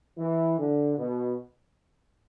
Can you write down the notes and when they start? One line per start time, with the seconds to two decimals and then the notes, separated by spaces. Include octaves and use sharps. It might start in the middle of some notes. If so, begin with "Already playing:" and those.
0.17 E3
0.57 D3
0.98 B2